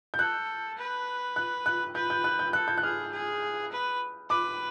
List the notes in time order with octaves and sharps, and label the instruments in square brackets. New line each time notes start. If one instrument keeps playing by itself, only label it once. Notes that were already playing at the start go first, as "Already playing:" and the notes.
[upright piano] G6
[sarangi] A4 [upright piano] F#6
[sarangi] B4
[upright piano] F#6
F#6
[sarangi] B4 [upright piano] G6
[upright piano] G6
F#6
G6
[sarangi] A4 [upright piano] F#6
[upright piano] G6
F#6
[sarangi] G#4 [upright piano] F6
[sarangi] G#4
B4
[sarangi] B4 [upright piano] D6